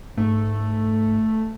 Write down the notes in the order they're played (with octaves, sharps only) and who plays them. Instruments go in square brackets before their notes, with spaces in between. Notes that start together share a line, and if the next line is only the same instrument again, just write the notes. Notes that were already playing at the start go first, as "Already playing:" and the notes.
[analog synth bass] G#2 [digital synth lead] A3